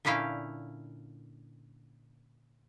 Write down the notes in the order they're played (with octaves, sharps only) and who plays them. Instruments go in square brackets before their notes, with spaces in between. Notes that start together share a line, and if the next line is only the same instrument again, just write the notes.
[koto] A#2 D3 C#4 E4 F5 G5